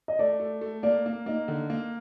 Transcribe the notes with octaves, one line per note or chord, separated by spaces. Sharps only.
D#5
A3 D5
A3
A3
A#3 D5
A#3
A#3 D#4 D#5
D3
A#3